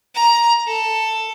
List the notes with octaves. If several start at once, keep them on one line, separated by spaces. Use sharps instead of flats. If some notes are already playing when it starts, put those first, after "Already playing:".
A#5
A4